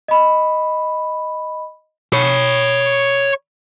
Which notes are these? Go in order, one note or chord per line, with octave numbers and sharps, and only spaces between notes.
D#5 B5
C#5 B5